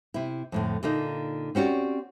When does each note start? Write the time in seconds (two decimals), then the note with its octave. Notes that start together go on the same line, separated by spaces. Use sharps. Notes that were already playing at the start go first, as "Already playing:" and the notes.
0.14 C3 E4
0.52 F2 A2 D3
0.83 A#2 D3 A#3 D#4
1.55 C4 C#4 F#4 G4 D5